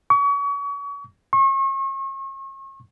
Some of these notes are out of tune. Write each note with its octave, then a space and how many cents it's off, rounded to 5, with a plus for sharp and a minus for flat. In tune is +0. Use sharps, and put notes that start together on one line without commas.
C#6 +35
C#6 -40